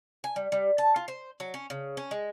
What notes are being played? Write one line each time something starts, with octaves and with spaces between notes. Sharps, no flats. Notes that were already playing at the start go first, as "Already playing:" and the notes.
G#5
G3
G3
A5
F4
C5
F#3
C#4
C#3
C#4
G#3